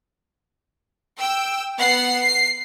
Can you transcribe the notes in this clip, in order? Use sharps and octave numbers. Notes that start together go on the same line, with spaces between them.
G5 E6
B3 F#5 C7
C7